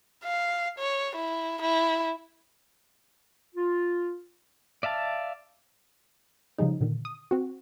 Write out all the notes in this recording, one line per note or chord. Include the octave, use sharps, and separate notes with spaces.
F5
C#5
E4
E4
F4
D5 E5 F5 A5
C#3 F3 G3 G#3 D#4
A#2 D3 D#3
D#6
C4 F#4